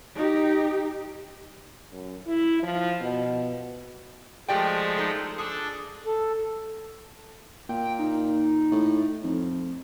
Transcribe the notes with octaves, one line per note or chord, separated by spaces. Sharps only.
D#4 G4
F#2
E4
F3
B2
F3 G#3 A3 G4 D5 G5
D#4 A4
D4 G#4 A4
A4
A#2 G5
D#4
A2
F2